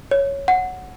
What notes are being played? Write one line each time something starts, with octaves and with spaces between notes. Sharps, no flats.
C#5
F#5